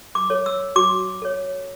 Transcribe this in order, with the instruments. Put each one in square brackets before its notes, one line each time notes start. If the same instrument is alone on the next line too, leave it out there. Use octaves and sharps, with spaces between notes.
[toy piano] D6
A4 C#5
E6
F#4 D6
A4 C#5